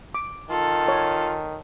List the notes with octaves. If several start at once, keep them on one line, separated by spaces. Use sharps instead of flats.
D6
D#3 F4 A4
C#5